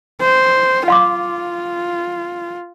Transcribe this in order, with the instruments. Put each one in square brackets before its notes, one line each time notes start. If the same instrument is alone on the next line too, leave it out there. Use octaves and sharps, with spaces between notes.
[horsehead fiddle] C5
[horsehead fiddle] F4 [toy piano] F5 C6 D6